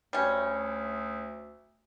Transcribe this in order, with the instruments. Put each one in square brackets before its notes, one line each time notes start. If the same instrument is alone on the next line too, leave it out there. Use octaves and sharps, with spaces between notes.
[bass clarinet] D2 [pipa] G3 C#4